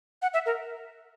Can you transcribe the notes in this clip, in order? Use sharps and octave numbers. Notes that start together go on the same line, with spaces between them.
F#5
E5
A#4